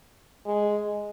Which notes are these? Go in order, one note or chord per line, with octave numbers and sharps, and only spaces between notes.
G#3